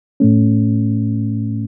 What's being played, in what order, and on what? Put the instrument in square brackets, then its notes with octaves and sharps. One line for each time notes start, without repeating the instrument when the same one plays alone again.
[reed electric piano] A2 A3 C#4